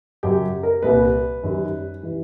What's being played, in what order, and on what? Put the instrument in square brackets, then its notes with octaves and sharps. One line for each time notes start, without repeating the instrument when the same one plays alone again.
[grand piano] F#2 C#3 F#3 G4
A#4
C2 A#2 G3 B4
F#2 D#3 G3
E3 G3